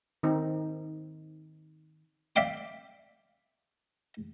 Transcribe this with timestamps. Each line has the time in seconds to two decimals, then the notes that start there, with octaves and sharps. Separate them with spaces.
0.23 D#3 C4 D#4
2.36 D5 E5 F5 G5 D6